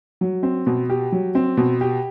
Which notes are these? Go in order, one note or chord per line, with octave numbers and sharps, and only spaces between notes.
F#3
C4
B2
G4
F#3
C4
B2
G4